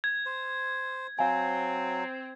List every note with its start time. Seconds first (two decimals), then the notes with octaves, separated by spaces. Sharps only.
0.04 G#6
0.26 C5
1.19 F#3 C4 F5 G#5